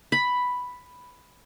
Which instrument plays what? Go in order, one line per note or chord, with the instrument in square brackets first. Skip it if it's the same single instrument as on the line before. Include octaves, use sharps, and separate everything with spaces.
[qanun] B5